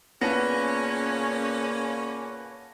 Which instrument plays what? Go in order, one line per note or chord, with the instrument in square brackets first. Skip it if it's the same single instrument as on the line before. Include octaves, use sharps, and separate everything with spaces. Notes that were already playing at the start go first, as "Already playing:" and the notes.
[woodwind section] A#2 C#3 A#3 [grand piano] B3 [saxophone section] C#4 [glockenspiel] A5 A#6